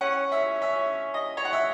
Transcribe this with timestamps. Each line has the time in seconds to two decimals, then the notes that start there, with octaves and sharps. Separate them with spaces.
0.01 C#4 F#5
0.32 E5
0.62 E5
1.14 D#5
1.37 C#5
1.45 F#5
1.53 E5